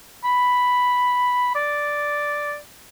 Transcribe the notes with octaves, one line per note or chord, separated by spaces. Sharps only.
B5
D5